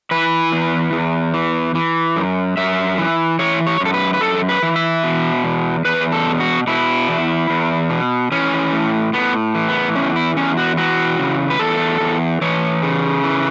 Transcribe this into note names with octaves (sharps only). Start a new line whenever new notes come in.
E3 B4
E2
E2
E3
E3
F#2
F#2 E5
E3
E3 C#5
C#5
F#2
A4
B4
B4
F#2 A4
B4
E3
E5
B2
E2
E2 B4
A4
B2
F#4
B2 E4
E2
E2
B2
E3 C#4
A2
A2 B3
E3
B3
E2 C#4
E4
E2 C#4
F#4
E3 F#4
C#3
B4
E2 A4
E2
E3 C#5
C#3
E3